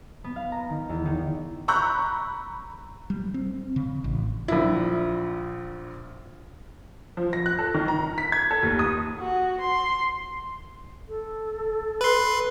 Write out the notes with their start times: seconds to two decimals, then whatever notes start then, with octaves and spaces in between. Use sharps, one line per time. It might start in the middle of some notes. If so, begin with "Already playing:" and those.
0.24 B3
0.36 F5
0.52 A#5
0.70 D#3
0.89 E2
1.05 D#3
1.68 A#5 B5 C#6 E6 F#6 G6
3.10 G3
3.34 C4
3.76 C#3
4.04 A1
4.48 A#1 A#2 E4
7.17 F3
7.33 A#6
7.46 F#6
7.59 A4
7.74 D#3
7.88 A#5
8.18 B6
8.32 G#6
8.51 A4
8.63 D#2
8.79 D#6
9.19 F#4
9.60 C6
11.08 A4
12.01 B4 C6